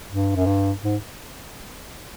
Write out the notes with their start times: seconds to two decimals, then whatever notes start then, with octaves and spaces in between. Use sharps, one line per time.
0.10 G2
0.36 F#2
0.46 G2
0.83 G#2